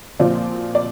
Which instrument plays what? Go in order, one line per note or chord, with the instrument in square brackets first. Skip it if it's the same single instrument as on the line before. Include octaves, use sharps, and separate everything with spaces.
[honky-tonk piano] A#2 F3 C4 F4 D5
D5